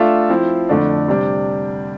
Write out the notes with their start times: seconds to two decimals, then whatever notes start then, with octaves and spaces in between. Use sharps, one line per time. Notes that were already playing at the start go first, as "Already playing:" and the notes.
Already playing: A3 D4 F4 A4 E5
0.29 F3 C4 E4
0.69 F2 D3 A3 D4
1.08 C3 G3 D4